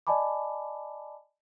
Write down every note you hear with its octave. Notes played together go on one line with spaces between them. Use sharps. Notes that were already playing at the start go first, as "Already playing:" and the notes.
D5 D#5 G#5 A5 B5 D6